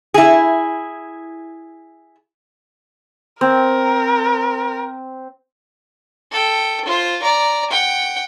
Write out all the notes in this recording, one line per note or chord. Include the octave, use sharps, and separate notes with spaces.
E4 G#4
C4 A#4
A4 G5
F4 C5
D5 A#5
F#5 G5